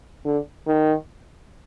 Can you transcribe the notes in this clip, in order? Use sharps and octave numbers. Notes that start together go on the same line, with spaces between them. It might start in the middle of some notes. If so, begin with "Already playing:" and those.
D3
D#3